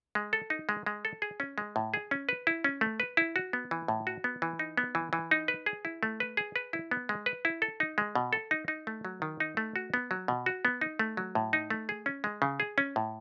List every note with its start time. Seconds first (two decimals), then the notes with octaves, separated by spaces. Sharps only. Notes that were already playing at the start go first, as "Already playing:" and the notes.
0.15 G#3
0.33 A4
0.50 D#4
0.69 G#3
0.86 G#3
1.05 A4
1.22 G#4
1.40 C#4
1.58 G#3
1.76 A2
1.94 G#4
2.11 C#4
2.29 B4
2.47 E4
2.64 C#4
2.81 A3
3.00 B4
3.17 E4
3.36 F#4
3.53 B3
3.71 E3
3.88 A2
4.07 F#4
4.24 B3
4.42 E3
4.59 D#4
4.77 B3
4.95 E3
5.13 E3
5.31 D#4
5.48 B4
5.66 G#4
5.85 E4
6.03 A3
6.20 B4
6.37 G#4
6.56 B4
6.73 E4
6.91 B3
7.09 G#3
7.26 B4
7.45 E4
7.62 A4
7.80 D#4
7.98 G#3
8.15 B2
8.33 A4
8.51 D#4
8.68 D#4
8.87 A3
9.05 F#3
9.22 D#3
9.40 D#4
9.57 A3
9.76 F#4
9.94 B3
10.11 F#3
10.28 B2
10.46 F#4
10.65 B3
10.81 D#4
10.99 A3
11.17 F#3
11.35 A2
11.53 D#4
11.70 A3
11.89 G#4
12.06 C#4
12.24 G#3
12.42 C#3
12.60 G#4
12.78 C#4
12.96 A2